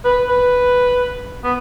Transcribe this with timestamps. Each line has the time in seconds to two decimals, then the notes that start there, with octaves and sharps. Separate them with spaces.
0.05 B4
0.29 B4
1.44 B3